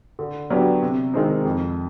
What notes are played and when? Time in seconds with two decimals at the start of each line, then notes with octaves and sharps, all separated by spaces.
0.19 D3
0.51 F#3 B3 D4 G4
0.82 C3
1.14 D#3 G#3 C4 D#4
1.45 F2